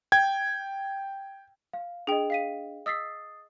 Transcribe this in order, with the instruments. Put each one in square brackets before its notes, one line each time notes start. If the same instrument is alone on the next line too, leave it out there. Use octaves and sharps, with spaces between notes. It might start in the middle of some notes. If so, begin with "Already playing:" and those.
[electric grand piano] G5 G#6
[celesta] F5
[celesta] D4 D#5 [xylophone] G#4 G5
[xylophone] F5 B6 D#7
[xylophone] D#5 E6 B6 [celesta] D#6 A6 C7